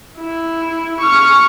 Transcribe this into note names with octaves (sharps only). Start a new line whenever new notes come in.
E4
C#6 F6